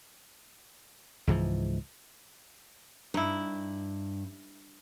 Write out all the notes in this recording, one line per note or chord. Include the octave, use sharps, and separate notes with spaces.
C#2 G#2 E3 F3
G2 D#4 E4